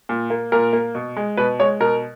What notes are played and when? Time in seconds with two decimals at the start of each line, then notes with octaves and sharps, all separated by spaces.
0.09 A#2
0.30 A#3
0.52 A#2 A#4
0.73 A#3
0.95 B2
1.16 G#3
1.37 B2 B4
1.59 G#3 C#5
1.80 B2 A#4